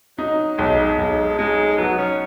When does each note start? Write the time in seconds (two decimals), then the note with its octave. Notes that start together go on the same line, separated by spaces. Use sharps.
0.18 F#3 D#4
0.57 B1 G#3
0.98 B1 G#3
1.38 G#3 D#4
1.78 F#3 B3
1.98 C#4